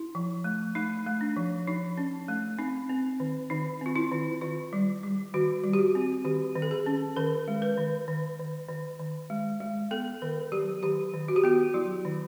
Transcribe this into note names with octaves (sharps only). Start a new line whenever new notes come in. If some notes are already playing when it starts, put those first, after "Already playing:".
Already playing: E4
F3
A3
A3 D#4
A3
D4
F3
F3 D#4
C#4
A3
C4 D#4
C4
D#3
D#3 D#4
C4 F4
E4
D#3
D#3 F4
G3
G3
D#3 F#4
G3
G4
F#4
C4
D#3 G4
D#3
A4
G#4
C#4
D#3 A#4
G#3
B4
D#3
D#3
D#3
D#3
D#3
G#3
G#3
B3 A4
D#3 A#4
F#3 G4
D#3 G4
D#3
F#4
G4
B3 F#4
F#3 E4
D#3